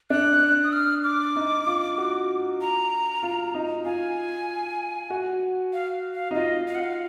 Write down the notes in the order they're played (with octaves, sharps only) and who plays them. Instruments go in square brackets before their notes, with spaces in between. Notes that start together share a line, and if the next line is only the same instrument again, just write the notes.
[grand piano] D4 [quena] F#6
[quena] D#6
F6
D6
[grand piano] D#4
F4
F#4
[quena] A#5
[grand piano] F4
D#4
[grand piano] F4 [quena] G#5
[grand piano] F#4
[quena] F5
F5
[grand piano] D#4
[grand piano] F4 [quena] D#5
[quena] F5
F#5
F5